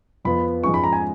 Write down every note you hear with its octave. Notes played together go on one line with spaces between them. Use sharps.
F2 F3 B3 B5
G#2 F3 G#3 C#4 F4 C#6
B5
A#5
G#5